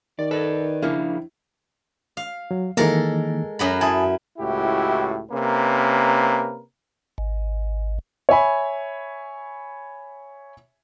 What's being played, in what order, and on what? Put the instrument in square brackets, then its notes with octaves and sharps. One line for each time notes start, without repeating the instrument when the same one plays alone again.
[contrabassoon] D#3 [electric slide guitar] D5
[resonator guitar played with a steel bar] A4 [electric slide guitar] B4 D5
[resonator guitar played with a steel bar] C#3 A#3 [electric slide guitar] F3 D4 [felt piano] E4
[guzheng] F5
[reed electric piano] F#3
[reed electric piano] D#3 E3 A#3 [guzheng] G#3 A4 A#4
[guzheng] F#2 F#3 B5
[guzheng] E4 [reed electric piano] G#5 A5 D#6
[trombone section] C#2 A2 E4 F#4 G4
C3 A#3 C#4 A#4 B4
[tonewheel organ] G#1
[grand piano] C#5 E5 G#5 B5